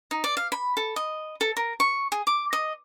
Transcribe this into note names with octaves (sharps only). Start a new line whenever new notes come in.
D#4
D5
F5
B5
A4
D#5
A4
A#4
C#6
G#4
D6
D#5